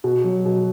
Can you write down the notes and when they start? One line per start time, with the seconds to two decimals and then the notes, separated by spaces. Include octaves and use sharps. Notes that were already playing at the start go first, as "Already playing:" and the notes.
0.04 B2 F#4
0.24 F#3
0.45 B2